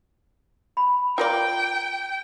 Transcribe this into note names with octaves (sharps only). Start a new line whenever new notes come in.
B5
F4 A#4 D5 G5 A#5